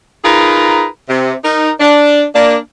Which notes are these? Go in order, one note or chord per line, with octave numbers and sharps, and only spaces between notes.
D#4 F4 G#4 A#4 B4
C3
D#4 A#4
D4
A#3 D4